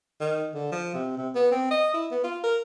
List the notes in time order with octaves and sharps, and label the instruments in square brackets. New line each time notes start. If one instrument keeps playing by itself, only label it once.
[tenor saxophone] D#3
D3
F3
C3
C3
B3
C4
D#5
E4
B3
F4
A#4